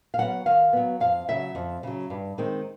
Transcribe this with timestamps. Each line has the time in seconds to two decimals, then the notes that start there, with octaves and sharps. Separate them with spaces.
0.14 F5
0.18 F#3 B3 F#5
0.46 D#3 F5
0.73 F#3 B3
1.00 F2 F5
1.28 C#3 F#3 E5
1.55 F2
1.83 C#3 F#3
2.10 G2
2.38 D#3 G#3 C4